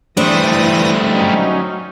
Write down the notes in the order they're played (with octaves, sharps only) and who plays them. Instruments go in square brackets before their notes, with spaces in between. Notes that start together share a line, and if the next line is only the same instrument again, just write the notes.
[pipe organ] E3 D#6 A#6 [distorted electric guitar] G3 A3 [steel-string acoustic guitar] D4 C5
[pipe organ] F#3 C#4 D#4